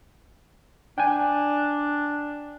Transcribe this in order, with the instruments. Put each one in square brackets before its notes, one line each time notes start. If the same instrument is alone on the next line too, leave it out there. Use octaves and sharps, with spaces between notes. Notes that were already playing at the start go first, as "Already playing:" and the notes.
[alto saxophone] D4 [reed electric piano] G5 G#5